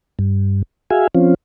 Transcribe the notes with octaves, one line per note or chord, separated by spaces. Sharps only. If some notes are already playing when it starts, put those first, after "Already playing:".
G2
F#4 G#4 E5 F5 G#5
F3 C4 C#4 F4